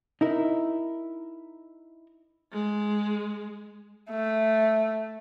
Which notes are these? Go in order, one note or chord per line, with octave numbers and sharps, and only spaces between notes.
D#4 E4 A#4
G#3
A3